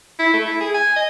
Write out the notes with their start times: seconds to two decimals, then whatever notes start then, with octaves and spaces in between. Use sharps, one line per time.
0.19 E4
0.34 A3
0.48 E4
0.61 G#4
0.74 G#5
0.96 D#5